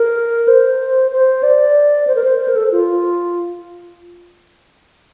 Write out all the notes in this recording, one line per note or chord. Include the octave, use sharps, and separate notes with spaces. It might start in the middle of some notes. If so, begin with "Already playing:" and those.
Already playing: A#4
C5
C5
D5
C5
A#4
C5
C5
A#4
A4
F4